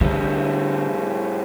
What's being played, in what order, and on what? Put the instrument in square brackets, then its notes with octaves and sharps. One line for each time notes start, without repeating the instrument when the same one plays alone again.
[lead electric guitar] A2 G3 [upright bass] D3